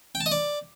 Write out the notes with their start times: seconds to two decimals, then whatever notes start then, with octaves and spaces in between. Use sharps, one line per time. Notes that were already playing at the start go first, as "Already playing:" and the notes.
0.15 G5
0.20 A5
0.26 D#5
0.32 D5